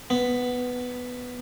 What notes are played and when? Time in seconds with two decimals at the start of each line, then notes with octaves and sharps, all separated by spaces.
0.10 B3